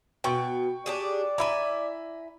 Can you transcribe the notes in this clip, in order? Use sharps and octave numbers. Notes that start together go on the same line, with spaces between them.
B2 G5 C#6
D4 G4 G#4 D5
E4 E5 G#5 A#5 B5